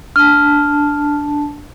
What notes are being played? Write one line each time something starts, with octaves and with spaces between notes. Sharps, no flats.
D4 A5 F6